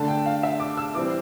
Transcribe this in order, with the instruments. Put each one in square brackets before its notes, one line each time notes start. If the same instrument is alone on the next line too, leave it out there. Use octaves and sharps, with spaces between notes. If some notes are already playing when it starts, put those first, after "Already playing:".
Already playing: [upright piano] D3 A3 D4 A5
G5
F5
E5
D6
E6
E3 G3 C4 D6